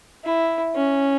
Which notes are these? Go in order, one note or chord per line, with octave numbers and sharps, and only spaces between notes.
E4
C#4